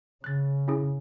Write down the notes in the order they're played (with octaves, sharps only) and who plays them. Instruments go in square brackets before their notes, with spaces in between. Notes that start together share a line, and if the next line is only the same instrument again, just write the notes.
[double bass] C#3 [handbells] F#6 A6
[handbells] C#4 E4 G#4